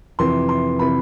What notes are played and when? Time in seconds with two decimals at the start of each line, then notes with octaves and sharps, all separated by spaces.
0.19 F2 C3 E3 C6
0.49 C6
0.79 C3 E3 B5